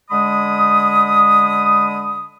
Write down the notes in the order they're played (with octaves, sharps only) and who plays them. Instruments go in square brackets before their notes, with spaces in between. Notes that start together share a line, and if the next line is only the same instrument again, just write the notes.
[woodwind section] D3 G#3 B5 D#6